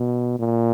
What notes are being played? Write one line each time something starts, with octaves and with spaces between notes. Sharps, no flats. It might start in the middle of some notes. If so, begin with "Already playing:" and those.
Already playing: B2
A#2